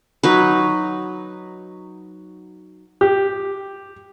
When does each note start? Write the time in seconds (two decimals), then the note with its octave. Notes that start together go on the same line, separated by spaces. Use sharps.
0.23 F#3 D#4 B4
3.01 G4